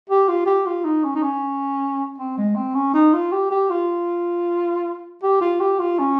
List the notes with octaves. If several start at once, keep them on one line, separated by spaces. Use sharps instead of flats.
G4
F4
G4
F4
D#4
C#4
D#4
C#4
C4
G#3
C4
C#4
D#4
F4
G4
G4
F4
G4
F4
G4
F4
C#4